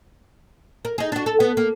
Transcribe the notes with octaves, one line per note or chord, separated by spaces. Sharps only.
A#4
D#4 G#4
D4 F#4
A4
B3
A#3